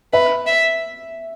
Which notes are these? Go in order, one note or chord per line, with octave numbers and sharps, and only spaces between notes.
B4 E5
E5